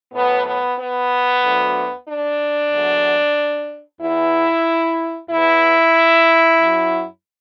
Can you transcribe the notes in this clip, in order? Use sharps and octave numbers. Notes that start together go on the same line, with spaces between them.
A2 F#3 B3
B3
B3
D2 D3 F#3
D4
E2 D3 F#3
E2 E3 E4
E2 E3 E4
F#2 F#3